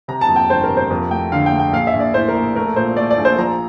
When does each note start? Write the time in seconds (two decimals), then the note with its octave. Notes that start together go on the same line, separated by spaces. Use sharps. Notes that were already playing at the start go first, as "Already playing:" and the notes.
0.08 C3 A#5
0.21 A5
0.28 F2
0.36 G5
0.49 G1 C5
0.63 A#4
0.69 C3
0.77 C5
0.90 F2 A#4
1.11 A3 G5
1.32 D3 F5
1.46 G5
1.52 A3
1.59 G5
1.73 A#1 F5
1.87 E5
1.94 A#1
2.00 D5
2.14 A2 C5
2.28 A#4
2.35 A#1
2.55 A3 A#4
2.76 A#2 C5
2.96 A3 D5
3.11 D5
3.18 A#1
3.25 C5
3.38 F3 A#5